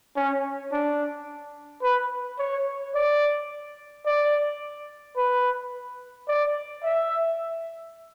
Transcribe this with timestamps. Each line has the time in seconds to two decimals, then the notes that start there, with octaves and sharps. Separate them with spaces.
0.16 C#4
0.72 D4
1.82 B4
2.39 C#5
2.95 D5
4.06 D5
5.17 B4
6.28 D5
6.83 E5